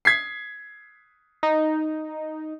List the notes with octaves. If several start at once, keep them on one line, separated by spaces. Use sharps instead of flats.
G#6 B6 C7
D#4